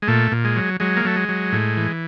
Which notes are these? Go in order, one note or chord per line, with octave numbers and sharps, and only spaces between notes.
G#3
A#2 A3
A#2
G#3
F#3
F#3 G#3
A#3
F#3 A3
G#3
F#3
A2
E3